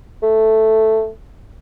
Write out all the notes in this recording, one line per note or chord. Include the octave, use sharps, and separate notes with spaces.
A3